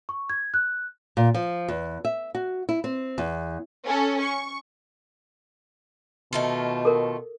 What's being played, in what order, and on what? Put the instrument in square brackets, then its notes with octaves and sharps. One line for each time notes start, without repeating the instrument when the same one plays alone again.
[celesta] C#6
G#6
F#6
[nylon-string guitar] A#2
F3
E2
E5
F#4
E4
C4
E2
[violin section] C#4 A4
C#6
[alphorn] B2 [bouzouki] D#3 A3 F4
[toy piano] A4 A#4